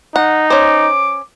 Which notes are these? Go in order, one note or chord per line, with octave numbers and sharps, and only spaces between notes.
D#4 F#5
C#4 C5 D6